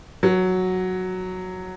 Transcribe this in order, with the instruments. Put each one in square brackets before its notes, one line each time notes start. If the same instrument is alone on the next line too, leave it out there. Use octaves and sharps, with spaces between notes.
[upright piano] F#3